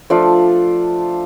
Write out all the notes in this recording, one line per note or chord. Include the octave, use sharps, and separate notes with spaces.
F3 A3 D4 F4 D5